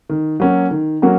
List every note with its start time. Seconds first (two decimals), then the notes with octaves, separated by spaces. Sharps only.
0.09 D#3
0.40 F#3 A#3 C#4 F#4
0.71 D#3
1.02 F#3 A#3 C#4 F#4